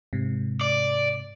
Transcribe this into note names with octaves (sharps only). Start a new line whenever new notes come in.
G#2 C3
D5